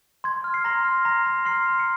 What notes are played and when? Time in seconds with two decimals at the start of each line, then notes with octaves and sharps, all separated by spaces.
0.24 C6 G#6
0.44 F6
0.54 C7
0.64 A#5 C6 A#6
0.85 F6
1.05 A#5 A#6
1.26 A#5
1.45 C6 F6 C7
1.66 F6
1.80 C#7